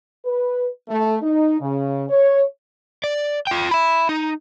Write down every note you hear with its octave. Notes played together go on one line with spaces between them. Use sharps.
B4
A3
D#4
C#3
C#5
D5
F4 G5
E5 B5
D#4